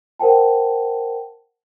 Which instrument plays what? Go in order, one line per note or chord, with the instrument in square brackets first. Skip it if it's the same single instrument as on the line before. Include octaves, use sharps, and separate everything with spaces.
[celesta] A#4 C5 F#5 G5 A5